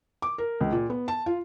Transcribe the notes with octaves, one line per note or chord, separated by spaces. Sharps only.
D6
A#4
C#2
A#2
B3
A5
F4